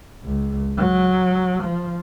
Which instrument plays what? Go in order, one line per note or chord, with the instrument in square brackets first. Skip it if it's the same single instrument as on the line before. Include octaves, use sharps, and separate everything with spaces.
[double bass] C#2
F#3
F3